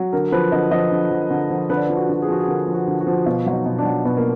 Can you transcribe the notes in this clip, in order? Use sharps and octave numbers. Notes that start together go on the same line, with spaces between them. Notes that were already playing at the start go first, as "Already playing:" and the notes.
Already playing: F#3
D3 A#4
F3 B4
D3 D#5
F3 D#5
D3
F3
D3
F3
D3 B4
D5
F3 B4
F#4
D3 F#4
G#4
F3 F#4
G#4
D3 A#4
F3
F#4
D3
F#4
F3
B2 F4
F#3 F4
D#4
B2
D4
F#3
B2 B3
A#3